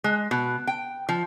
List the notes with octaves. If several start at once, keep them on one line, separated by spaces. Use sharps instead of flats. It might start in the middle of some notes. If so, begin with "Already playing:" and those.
G#3
B2
G5
F3